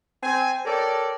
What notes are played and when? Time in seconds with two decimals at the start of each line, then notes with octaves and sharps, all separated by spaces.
0.23 C4 G#5
0.65 G4 A4 A#4 C#5 D5